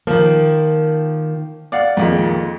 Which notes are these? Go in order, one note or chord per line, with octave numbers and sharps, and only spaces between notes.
D#3 F3 A#3
D5 F5 F#5
F2 A#2 D#3 G#3